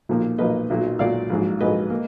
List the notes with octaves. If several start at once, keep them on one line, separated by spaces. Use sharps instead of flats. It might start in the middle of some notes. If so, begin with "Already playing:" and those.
B1 A#2 F3 A#3
B1 A#2 F3 A#3 B4 D#5
B1 A#2 F#3
B1 A#2 F#3 D5 F5
A#1 G#2 F#3
A#1 G#2 F#3 B4 D#5
A#3